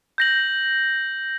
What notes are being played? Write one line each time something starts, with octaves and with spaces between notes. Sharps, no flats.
G6 A#6 F#7